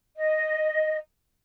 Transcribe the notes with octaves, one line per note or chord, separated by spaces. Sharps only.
D#5